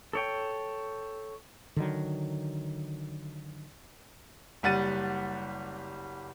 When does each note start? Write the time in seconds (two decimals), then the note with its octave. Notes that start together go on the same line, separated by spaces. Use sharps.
0.13 A4 C#5 G5
1.76 D3 D#3 F#3
4.63 F#1 G3 F#5 A6 D#7